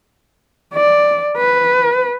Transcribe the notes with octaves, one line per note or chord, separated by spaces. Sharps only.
D5
B4